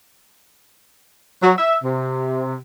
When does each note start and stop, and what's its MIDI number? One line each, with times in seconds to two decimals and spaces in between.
1.43 1.53 54
1.58 1.76 76
1.84 2.59 48